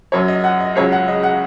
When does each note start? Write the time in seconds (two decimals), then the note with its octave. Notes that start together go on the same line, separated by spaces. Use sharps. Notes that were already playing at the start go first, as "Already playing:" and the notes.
0.12 F#2 F#3 C#5
0.28 D#5
0.44 F#5
0.60 D#5
0.76 C#2 C#3 F#3 C#5
0.92 F#5
1.08 D#5
1.23 F#5